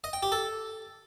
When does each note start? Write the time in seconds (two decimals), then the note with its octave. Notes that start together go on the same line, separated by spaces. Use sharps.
0.04 D#5
0.13 G5
0.23 G4
0.32 A4